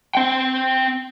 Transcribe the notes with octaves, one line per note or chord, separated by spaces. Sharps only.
C4 G5